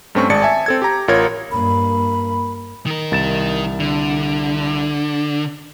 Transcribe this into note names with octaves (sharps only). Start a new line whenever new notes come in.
G2 A3 C4 C#4 C#6
G#1 G#3 D5 A5 C#7
E5 G#5 A5
C4 A4 G#6
G4 A#5
A1 F4 A#4 C#5 G#6
G2 A#3 B5
D#3 A#4
C2 A6 E7
D3